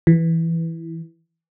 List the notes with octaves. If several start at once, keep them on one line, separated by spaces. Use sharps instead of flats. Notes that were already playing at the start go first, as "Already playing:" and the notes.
E3